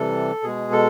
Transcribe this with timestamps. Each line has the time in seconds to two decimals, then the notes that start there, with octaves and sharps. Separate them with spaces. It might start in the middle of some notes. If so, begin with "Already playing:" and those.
Already playing: C3 E3 G3 A4
0.43 B2 G#3 G#4
0.72 A4